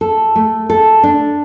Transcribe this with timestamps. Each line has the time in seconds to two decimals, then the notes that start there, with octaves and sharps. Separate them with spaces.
0.01 A4
0.36 A3
0.70 A4
1.03 D4